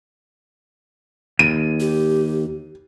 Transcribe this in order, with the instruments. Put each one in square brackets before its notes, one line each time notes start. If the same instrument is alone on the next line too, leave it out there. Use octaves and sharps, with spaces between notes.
[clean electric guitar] D#2 [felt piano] D#7
[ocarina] G4